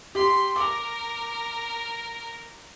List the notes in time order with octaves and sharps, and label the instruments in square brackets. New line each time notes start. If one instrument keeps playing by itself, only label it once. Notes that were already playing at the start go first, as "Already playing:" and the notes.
[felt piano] G4 [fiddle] C6
[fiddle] A#4 [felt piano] D6